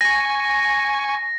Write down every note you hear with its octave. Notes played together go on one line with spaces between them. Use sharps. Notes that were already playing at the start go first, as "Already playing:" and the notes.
G#5 C#6 A#6